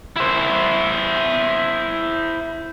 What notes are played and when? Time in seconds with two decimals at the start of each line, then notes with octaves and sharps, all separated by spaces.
0.16 E4 C5